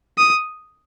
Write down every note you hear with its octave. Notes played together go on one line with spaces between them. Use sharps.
D#6